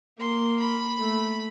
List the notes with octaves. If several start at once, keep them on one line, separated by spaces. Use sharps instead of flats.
A#3 C6
B5
A3